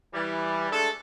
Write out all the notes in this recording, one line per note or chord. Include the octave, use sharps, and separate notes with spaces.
E3 G3
G#3 A3 D4 A4